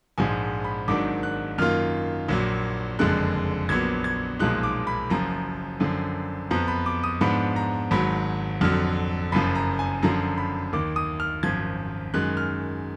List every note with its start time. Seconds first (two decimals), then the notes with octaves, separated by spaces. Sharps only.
0.18 A#1 G#2 F3 G#3 G#5
0.64 B5
0.88 G#1 G#2 D#3 F#3 D4 D6
1.23 F#6
1.58 F#2 D#3 A#3 F4 F6
2.28 A#1 A#2 F#3
2.99 F#1 F2 D3 G#3 F#6
3.69 A#1 A#2 F#3 B3 G#6
4.04 G#6
4.39 B1 A#2 F3 G#3 D#4 F#6
4.63 D6
4.87 B5
5.10 F#1 F#2 F3 A#5
5.80 F#2 D3 F3
6.51 F2 F3 B3 A#5
6.68 B5
6.86 D6
7.04 D#6
7.21 G#2 F3 B3 D4 B5
7.56 A#5
7.91 G#1 G#2 F#3 B5
8.61 F2 D3 F#3 F6
9.32 F#1 F#2 F3 B5
9.55 A#5
9.79 G#5
10.03 F#2 D3 F3 A#5
10.38 B5
10.73 D#2 D#3 A#3 D6
10.96 D#6
11.20 F6
11.43 G#1 F#2 F3 G#6
12.14 F#2 D#3 G#3 F#6
12.37 F6